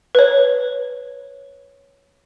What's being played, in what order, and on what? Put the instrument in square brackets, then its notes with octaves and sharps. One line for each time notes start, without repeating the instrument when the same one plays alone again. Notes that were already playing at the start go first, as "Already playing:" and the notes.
[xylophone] B4 C#5